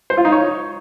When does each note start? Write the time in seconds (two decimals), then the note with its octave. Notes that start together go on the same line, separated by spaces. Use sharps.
0.10 C5
0.17 F4
0.25 D#4
0.32 C#5